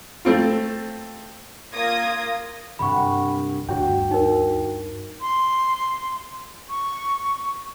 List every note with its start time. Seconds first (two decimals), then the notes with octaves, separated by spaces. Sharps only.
0.25 A3 C4 F4
1.73 A#3 F4 D#6 G#6 A#6
2.79 C2 G2 F#5 B5 C#6
3.69 D2 G2 F#4 G5
4.11 D#4 A#4
5.21 C6
6.70 C#6